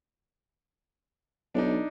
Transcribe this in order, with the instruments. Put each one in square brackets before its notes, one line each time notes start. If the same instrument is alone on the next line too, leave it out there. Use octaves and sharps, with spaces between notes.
[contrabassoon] B1 [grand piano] D4 D#4